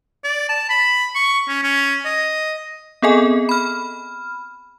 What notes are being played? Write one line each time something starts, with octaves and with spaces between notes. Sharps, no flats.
D5
A5
B5
C#6
C#4
C#4
D#5
B3 C4 G#4 A4 D#5 G#5
B5 F6